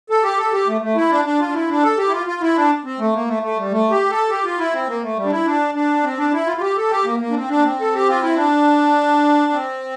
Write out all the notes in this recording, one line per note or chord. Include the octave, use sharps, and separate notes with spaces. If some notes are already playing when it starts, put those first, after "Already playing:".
A4
G4
A4
G4
A3
A3
E4
D4
D4
F4
D4
E4
D4
A4
G4
E4
F4
F4
E4
D4
C4
A3
A#3
A3
A3
G3
A3
G4
A4
G4
F4
E4
C4
A#3
A3
G3
D4
E4
D4
D4
C4
D4
E4
F4
F4
G4
A4
G4
A#3
A#3
D4
C4
D4
A#3
C4
A4
G4
F4
E4
D4
C4